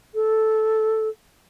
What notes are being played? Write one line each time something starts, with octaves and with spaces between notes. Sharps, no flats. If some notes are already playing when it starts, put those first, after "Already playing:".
A4